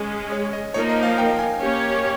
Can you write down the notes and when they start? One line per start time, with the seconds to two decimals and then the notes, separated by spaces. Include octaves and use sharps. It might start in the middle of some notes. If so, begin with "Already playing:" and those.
Already playing: G#3 C#4 G#4
0.32 C#5
0.53 D#5
0.74 F3 A#3 D#4 A#4 C#5
0.89 D#5
1.03 F5
1.18 G5
1.39 G#5
1.60 A#3 C#4 G4 C#5